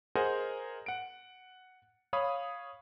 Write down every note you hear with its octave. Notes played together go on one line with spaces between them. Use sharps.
G#4 A#4 C5 D#5 F#5 G#5
F#5 D7
C#5 F5 B5 D#6